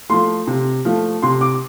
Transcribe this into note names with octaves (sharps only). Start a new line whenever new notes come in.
F3 A3 C6
C3
F3 A3
C3 C6
D6